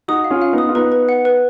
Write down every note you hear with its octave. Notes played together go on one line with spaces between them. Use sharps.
D#4 F#4 D#6
F5
C#4 F4
F5
B3 D#4
D#6
F4
B3 D#4 B4
B4
F#5
B4